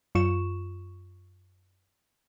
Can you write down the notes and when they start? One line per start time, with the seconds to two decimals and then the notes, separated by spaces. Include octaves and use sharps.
0.15 F#2 F4 C#6 E7